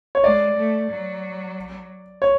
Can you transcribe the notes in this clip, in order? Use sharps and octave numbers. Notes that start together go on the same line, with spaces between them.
C#5
G#3 D5
A3
F#3
C#5